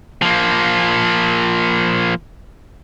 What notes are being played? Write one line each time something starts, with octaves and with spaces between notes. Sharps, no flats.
F3 A#3